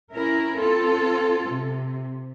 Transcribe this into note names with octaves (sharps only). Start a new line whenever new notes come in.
C#4 E4 A#4
C4 F4 A4
C3